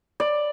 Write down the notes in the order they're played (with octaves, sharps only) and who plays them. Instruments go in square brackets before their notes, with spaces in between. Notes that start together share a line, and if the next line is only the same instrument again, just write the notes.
[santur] D5